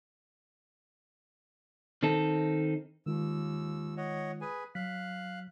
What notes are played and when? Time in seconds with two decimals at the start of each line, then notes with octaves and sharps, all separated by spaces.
2.03 D#3 C4 D#4 A4
3.06 D#2 D#3 G#3 F4 E6
3.97 C#5 D#5 F#5
4.41 G#4 B4 G#5
4.75 F#3 F5 F#6 B6